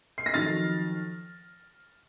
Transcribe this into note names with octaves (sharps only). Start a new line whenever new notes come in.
C7
A#6
F2 D#3 F#3 F6 A6